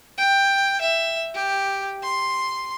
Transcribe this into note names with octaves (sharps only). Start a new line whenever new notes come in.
G5
E5
G4
C6